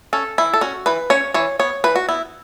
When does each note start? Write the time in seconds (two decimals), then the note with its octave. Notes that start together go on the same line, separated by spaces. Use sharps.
0.13 C#4 A4
0.38 E3 E4
0.54 A4
0.61 C#4 F#4
0.86 E3 B4
1.10 C#4 C#5
1.34 E3 C#5
1.59 B3 C#5
1.84 E3 B4
1.96 F#4
2.09 B3 E4